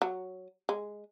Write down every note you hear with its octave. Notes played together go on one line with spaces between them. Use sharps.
F#3
G#3